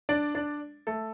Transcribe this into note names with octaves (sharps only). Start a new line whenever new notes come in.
D4 D5
D4 D5
A3 A4